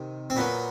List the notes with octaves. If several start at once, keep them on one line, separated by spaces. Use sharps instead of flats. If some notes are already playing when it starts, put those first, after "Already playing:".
Already playing: C3 D#3
C4
A#2 F#3 B3